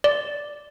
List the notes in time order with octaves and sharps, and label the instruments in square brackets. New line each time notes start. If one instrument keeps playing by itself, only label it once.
[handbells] D5